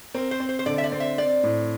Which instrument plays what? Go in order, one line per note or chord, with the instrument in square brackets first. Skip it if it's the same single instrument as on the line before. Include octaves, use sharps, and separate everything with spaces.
[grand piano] C4 [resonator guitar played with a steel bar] A#4
[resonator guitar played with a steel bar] C5
[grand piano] C4
[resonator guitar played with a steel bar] C5
C5
[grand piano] D3 [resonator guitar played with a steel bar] D5
[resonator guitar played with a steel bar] E5
D5
[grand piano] C4
[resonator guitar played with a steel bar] E5
[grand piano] C4 [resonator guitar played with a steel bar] D5
[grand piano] A2